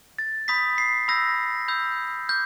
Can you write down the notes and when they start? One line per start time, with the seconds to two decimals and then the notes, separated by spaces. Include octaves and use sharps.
0.19 A6
0.48 B5 D#6 G6 B6
0.78 C7
1.08 B5 E6 G6 A#6
1.68 B5 E6 G6
2.29 D6 F6 G6